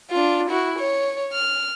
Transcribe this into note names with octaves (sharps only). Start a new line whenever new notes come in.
D4 F4
E4 F#4
C#5
F6